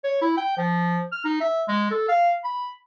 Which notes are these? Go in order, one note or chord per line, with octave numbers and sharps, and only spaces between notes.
C#5
E4
G5
F3
F6
D#4
E5
G#3
A4
F5
B5